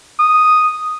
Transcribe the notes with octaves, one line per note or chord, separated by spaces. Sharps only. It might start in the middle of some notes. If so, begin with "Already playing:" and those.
D#6